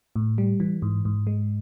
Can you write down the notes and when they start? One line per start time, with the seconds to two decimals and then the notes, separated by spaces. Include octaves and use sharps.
0.16 A2
0.38 G3
0.60 E3
0.82 G#2
1.05 G#2
1.27 G#3